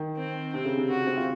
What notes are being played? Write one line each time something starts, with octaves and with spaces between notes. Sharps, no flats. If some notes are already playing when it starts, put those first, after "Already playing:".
Already playing: D#3
C4
C3 C4
C#3
C3
C#3 F#4
C4
F4